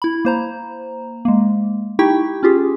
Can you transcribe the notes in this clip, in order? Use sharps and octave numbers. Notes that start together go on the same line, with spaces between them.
E4 B5
A#3 C5 A#5
G#3 A#3
D#4 E4 G4 G5 C#6
C#4 F4 G4 G#4